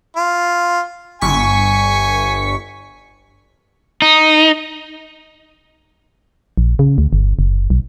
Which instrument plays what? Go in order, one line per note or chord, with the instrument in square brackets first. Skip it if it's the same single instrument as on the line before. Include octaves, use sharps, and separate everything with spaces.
[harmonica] F4
[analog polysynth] G1 C#6 B6 [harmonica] G#5
[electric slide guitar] D#4
[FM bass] A#1
C#3
D2
G1
F#1
B1